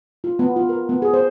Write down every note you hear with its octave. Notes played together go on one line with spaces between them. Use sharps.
F4
B3
F4
A#4
B3
G#4
C5